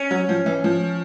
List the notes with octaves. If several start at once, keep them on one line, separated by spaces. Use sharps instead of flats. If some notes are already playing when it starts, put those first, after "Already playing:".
Already playing: C#4
F#3
F3
E3
F3